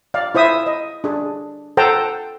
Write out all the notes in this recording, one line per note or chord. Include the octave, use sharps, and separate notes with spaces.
D5 F5
E4 C5 E5 D#6
D#5
D4 G#4
A4 C5 F#5 G5 A5 A#5